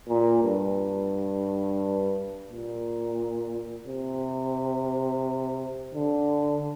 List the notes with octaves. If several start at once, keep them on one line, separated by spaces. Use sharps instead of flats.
A#2
G2
A#2
C3
D3